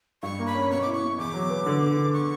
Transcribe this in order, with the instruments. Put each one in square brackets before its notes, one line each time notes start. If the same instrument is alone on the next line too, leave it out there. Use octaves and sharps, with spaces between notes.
[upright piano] G2 [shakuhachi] C#6
[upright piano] A#3
[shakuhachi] B5
[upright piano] C#4
[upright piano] B2 [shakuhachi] C#6
[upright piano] E4 [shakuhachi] D6
[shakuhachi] C#6
[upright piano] B2
[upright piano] E2 [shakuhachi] D6
[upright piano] F#3
B3
D3
B3
D3
[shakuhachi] C#6